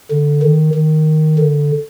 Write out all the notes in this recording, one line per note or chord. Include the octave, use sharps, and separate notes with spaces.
D3
D#3
D#3
D3